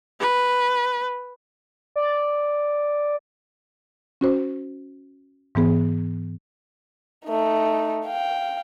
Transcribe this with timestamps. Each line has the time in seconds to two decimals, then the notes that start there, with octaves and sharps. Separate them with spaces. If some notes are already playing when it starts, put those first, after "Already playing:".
0.20 B4
1.96 D5
4.21 C#4 F#4 C5
5.55 G#2 E3 B3 G#4
7.26 A3 D#4
8.07 F5 G5